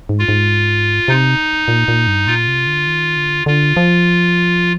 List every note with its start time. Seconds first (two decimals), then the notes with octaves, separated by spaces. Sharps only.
0.09 G#2
0.19 F4
0.29 G#2
1.08 C3 D#4
1.68 A#2
1.88 A#2
2.07 G2
2.27 A#2 F4
2.48 C3
2.67 D3
2.87 D#3
3.17 D3
3.46 D3 F4
3.77 F3